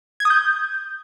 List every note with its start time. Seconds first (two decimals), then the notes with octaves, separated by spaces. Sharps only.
0.20 G#6
0.25 D#6
0.30 G6